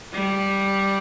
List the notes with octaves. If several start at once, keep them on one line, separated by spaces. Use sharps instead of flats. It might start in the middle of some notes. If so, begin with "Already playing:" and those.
G3